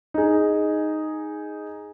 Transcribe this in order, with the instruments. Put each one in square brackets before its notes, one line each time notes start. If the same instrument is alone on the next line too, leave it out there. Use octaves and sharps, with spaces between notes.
[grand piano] D#4 G#4